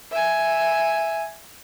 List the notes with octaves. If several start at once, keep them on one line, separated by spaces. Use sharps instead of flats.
E5 G#5